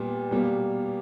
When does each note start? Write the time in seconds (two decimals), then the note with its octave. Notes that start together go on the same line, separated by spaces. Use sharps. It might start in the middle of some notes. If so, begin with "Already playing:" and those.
Already playing: A#2 G3 B3
0.31 B2 G3 A#3